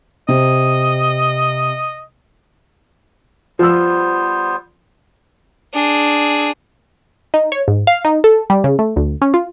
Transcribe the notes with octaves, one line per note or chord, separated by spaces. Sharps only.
C3 D#5
F3 G3 B3 C5 E6
D4 G#4
D#4
C#5
G#2
F5
D#4
A4
G3
C#3
A3
D2
C#4
F4